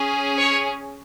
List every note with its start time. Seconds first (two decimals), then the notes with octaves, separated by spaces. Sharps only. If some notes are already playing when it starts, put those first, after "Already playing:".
Already playing: C#4 G#4
0.38 C#5